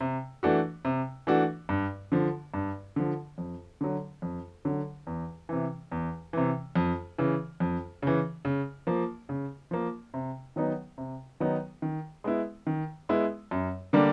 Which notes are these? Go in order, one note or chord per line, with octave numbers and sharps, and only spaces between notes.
C3
E3 A3 D4 F#4
C3
E3 A3 D4 F#4
G2
D3 F3
G2
D3 F3
F2
D3 F#3
F2
D3 F#3
E2
C3 E3
E2
C3 E3
F2
C#3 E3
F2
C#3 E3
C#3
F3 A#3
C#3
F3 A#3
C3
D#3 F#3 B3 D#4
C3
D#3 F#3 B3 D#4
D#3
G#3 B3 E4
D#3
G#3 B3 E4
F#2
D3 G3 A#3 D4